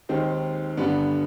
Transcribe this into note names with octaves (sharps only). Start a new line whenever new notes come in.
D#2 D#3 G#3 C4 D#4
G2 D3 G3 B3